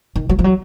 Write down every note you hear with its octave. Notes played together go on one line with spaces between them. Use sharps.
D#3
F#3
F3
F#3